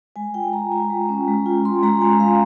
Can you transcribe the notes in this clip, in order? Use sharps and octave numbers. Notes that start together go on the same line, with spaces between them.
G#3 G#5
F4 G5
G#3 A#5
F4 A#5
G#3
C#4
G#3
F4
G#3 C6
G#3 A#5
G#3 G#5
G#3 F5